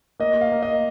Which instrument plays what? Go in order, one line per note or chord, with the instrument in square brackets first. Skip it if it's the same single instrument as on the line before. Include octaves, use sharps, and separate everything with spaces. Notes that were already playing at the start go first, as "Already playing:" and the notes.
[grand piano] A#3 D#5
F5
A#3
D#5